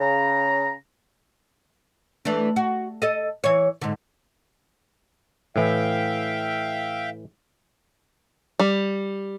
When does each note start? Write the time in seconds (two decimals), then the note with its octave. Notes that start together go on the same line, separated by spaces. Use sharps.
0.01 C#3 A#5
2.25 E3 A3 D4
2.56 F#4
3.02 A4 D#5
3.44 E3 C#5
3.81 G#2 D3
5.56 A2 E3 E5 F5 G5
8.60 G3